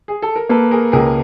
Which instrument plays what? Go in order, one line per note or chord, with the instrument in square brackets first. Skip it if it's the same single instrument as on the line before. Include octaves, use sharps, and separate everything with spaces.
[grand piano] G#4
A4
A#4
[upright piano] A#3 [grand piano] A4 B4
[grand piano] G#4 A#4
[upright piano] C#2 [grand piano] G#4 A#4